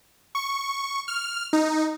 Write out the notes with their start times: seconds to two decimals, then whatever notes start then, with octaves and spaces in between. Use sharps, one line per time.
0.35 C#6
1.08 F6
1.53 D#4